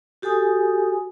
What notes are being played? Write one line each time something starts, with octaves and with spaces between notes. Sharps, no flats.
F#4 G4 A4 G#5 D#6